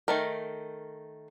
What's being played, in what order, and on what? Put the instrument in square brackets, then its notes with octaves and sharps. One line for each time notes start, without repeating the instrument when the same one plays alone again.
[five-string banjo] D#3 A3 A#4